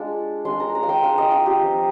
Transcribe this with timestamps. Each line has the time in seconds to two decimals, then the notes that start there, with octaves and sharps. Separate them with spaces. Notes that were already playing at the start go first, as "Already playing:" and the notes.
Already playing: G#3 D4 F4
0.45 G#3 D4 F4 C6
0.60 A#5
0.75 A#5
0.83 F5
0.89 G5
1.03 G#3 D4 F4 F5
1.18 D#5
1.31 F4
1.46 G4
1.60 F3 C4 F4